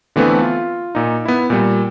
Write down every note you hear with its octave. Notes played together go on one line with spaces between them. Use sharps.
D3 E3 A3 B3 C4 B4
F4
A#2 D#4
B3 E4
A#2 G3